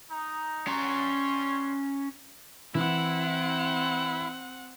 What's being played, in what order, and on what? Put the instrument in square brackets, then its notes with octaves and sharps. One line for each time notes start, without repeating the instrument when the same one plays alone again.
[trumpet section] D#4
[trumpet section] G3 C#5 C6 [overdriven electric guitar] C#4 A#5
[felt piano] E3 [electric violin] C4 F#5 [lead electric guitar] E4